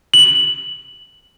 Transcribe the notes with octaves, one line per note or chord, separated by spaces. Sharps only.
F#7